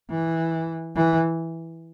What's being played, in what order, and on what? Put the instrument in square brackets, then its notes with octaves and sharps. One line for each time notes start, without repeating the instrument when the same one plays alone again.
[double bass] E3
E3